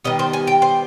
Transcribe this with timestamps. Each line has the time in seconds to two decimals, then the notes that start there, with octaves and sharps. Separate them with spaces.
0.04 D#3 G3 B3 D#5
0.19 C5
0.33 G#5
0.47 G5
0.62 C5